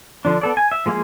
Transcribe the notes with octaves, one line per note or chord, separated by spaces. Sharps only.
D3 F3 D4
B3 A4 D5
G#5
E5
F3 G#3 A#3 E4 G#4